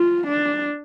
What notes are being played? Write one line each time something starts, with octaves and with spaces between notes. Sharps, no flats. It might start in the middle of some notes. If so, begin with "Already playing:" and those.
Already playing: F4
D4